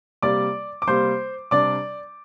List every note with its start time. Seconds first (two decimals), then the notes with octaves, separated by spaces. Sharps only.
0.23 C3 G3 A#3 D5 D6
0.82 D6
0.87 C3 G3 A#3 C5 C6
1.51 C3 G3 D4 D5 D6